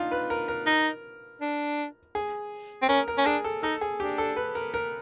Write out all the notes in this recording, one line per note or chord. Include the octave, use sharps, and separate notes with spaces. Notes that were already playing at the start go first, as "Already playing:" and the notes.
Already playing: D4 D#4 F4
B4
A#4
A#4
D#4
D4
G#4
C4
C#4 A#4
A#4
C#4
D4 G#4
A4
D#4 A4
G#4
D4 G4
A4
B4
A#4
A#4